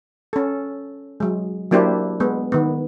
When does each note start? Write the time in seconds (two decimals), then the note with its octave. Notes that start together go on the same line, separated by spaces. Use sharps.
0.33 C#4 A4
1.20 F#3 G#3
1.71 F#3 A#3 D4 E4 G4 C5
2.20 G#3 B3
2.52 D#3 B3